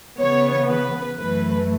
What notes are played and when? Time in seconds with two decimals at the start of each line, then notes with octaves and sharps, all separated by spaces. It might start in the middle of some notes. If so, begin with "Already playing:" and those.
0.19 C#3 E3 B3 C#5
0.69 B4
1.17 F#2 E3 A3 B4